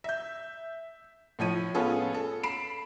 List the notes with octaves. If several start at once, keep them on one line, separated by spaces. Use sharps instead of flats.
E5 G6
A2 F3 C#5 D#7
B3 C#4 F4 G#4 A4
A4
B5 C7 D7 E7